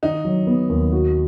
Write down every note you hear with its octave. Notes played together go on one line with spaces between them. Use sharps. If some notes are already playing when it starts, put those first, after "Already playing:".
D#3 D#4
F#3
B3
D#2
F#4